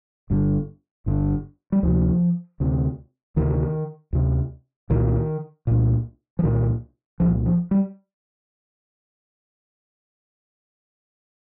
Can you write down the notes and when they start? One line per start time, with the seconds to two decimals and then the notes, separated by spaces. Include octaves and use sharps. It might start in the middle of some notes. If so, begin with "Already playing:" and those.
0.30 G1 G2 D3
1.06 G1 G2 D3
1.72 G3
1.83 D2 C3 F3
2.60 D2 C3
3.36 D2 C3 D#3
4.13 D2 C3
4.90 C2 A#2 D#3
5.67 C2 A#2
6.39 F3
6.43 C2 A#2 D#3
7.20 C2 A#2 F3
7.46 F3
7.71 G3